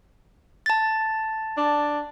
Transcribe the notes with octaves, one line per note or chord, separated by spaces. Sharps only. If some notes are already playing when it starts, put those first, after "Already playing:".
A5 A6
D4